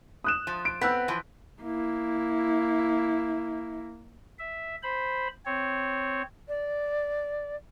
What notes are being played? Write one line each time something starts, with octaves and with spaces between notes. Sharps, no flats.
D#6 F#6 E7
F3
D7
B3 C4 E6 F#6 B6
E3 F3
A#3 E4
E5
C5 B5
C4 C#5
D5